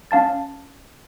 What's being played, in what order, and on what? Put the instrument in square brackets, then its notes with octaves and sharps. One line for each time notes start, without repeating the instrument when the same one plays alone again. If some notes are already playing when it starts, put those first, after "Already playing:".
[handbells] C#4 F5 A5 A6